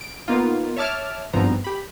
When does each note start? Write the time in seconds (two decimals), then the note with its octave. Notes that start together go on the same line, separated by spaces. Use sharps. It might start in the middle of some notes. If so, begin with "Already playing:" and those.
0.01 D7
0.28 A#3 B3 D#4 F4
0.76 C#5 E5 A5 D6 F6
1.33 G#1 G2 F3 B3 C4 A#5
1.64 G4 B5